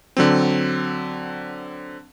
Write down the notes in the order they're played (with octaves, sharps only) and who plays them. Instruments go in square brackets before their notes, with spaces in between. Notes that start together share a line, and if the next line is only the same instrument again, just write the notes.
[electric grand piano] D3 F#3 C4